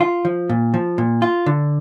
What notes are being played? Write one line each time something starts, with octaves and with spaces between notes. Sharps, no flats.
F4
F3
A#2
F3
A#2
F4
D3